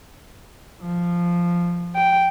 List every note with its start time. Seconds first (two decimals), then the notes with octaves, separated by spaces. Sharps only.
0.81 F3
1.96 G5